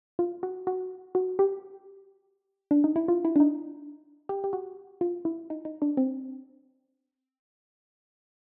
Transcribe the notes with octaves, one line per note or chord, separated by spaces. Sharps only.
F4
F#4
F#4
F#4
G4
D4
D#4
E4
F4
E4
D4
D#4
G4
G4
F#4
F4
E4
D#4
D#4
D4
C4